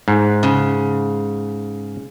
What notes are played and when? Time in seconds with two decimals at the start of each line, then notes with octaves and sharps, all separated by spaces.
0.08 G#2
0.43 C#3